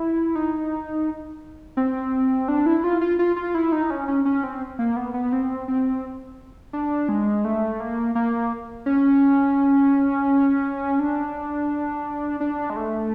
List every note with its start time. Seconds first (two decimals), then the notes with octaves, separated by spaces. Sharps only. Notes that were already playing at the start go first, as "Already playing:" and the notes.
Already playing: E4
0.35 D#4
1.77 C4
2.48 D4
2.66 E4
2.84 F4
3.01 F4
3.19 F4
3.36 F4
3.55 E4
3.72 D#4
3.90 C#4
4.08 C#4
4.25 C#4
4.44 C4
4.79 A#3
4.96 B3
5.14 B3
5.33 C4
5.68 C4
6.73 D4
7.09 G#3
7.45 A3
7.80 A#3
8.15 A#3
8.86 C#4
10.99 D4
12.40 D4
12.70 G#3
12.76 A3